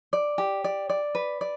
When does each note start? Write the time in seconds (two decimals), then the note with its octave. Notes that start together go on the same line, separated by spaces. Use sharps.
0.13 D5
0.38 G4
0.64 D5
0.89 D5
1.15 B4
1.41 D5